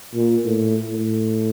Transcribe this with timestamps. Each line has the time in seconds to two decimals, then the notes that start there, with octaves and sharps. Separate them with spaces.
0.15 A#2
0.45 A2
0.90 A2